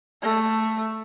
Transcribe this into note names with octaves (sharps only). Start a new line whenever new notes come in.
A3